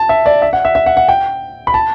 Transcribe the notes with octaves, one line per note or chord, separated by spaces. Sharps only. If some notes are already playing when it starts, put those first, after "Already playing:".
Already playing: A5
E5
D5
E5
F#5
E5
E5
F#5
F#5
G5
B5
A5